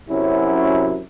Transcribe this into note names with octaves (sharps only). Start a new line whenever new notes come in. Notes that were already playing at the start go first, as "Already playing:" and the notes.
F#2 C3 F#3 C#4 E4